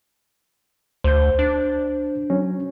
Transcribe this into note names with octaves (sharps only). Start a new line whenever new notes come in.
D2 C5 G6
D4
F#3 C#4